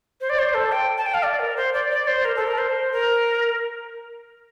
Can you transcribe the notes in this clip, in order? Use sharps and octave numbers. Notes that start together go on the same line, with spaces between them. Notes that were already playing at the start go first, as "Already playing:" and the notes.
C5
D5
C5
A4
G5
A5
G5
F5
D5
A#4
C5
D5
D5
C5
A#4
A4
A#4
C5
A#4